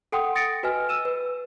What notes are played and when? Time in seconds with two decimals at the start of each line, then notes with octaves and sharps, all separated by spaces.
0.12 A4 F#5 G5 C6 D#6
0.35 D#6 A6 A#6 C#7 D7
0.63 F#4 B4 D#5 G#5 F6
0.89 E6 D#7 E7
1.05 B4